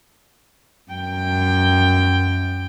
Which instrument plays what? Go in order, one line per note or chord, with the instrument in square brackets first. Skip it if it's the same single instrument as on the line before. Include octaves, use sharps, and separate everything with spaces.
[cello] F#2 G5